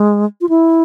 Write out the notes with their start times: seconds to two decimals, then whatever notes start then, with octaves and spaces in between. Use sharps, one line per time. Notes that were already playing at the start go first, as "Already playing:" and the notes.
Already playing: G#3
0.41 F4
0.49 E4